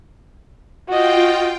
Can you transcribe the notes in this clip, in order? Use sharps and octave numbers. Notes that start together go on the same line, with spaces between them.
F4 F#4 D#5 G5